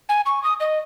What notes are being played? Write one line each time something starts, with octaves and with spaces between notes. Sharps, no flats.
G#5
C#6
D#6
D#5